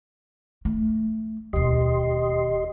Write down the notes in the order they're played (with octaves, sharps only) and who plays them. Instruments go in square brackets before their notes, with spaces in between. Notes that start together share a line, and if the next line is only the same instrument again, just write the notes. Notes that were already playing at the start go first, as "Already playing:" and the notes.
[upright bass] A3
[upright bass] E1 D#2 [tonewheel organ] G4 D#5 C6